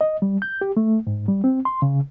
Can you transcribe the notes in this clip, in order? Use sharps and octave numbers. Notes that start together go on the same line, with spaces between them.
D#5
G3
G6
G4
A3
G#2
G3
C4
C6
C#3